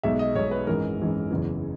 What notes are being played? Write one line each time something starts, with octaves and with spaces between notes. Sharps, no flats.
B1 B2 G#3 E5
D#5
B1 B2 G#3 C#5
B4
G#1 F#2 E3 G#3 A#4
G#1 F#2 E3 G#3
F#1 E2 C#3 E3